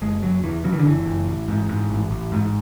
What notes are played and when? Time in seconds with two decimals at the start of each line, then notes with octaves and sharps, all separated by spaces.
0.02 F#1 G#3
0.23 F#1 F#3
0.43 E2 E3
0.64 C#3 F#3
0.72 E3
0.80 D3
0.85 F#1 E3
1.06 F#1
1.27 A1
1.48 G#2
1.69 G#2
1.90 A1
2.11 A1
2.32 G#2